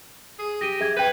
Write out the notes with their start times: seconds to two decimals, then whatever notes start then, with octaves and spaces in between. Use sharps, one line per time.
0.39 G#4
0.61 G4 A#6 D#7
0.80 G#4 E5 G#6
0.97 B4 G5 G6